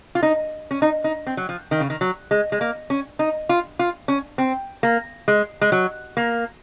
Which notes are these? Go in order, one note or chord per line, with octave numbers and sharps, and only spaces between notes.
F4
D#4
C#4
D#4
D#4
C4
F#3
F3
D#3
C#3
D#3
F#3
G#3
G#3
A#3
C#4
D#4
F4
F4
C#4
C4
A#3
G#3
G#3
F#3
A#3